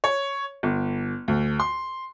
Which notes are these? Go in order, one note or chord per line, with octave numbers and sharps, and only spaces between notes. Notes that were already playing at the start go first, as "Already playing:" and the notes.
C#5
G1
D2
C6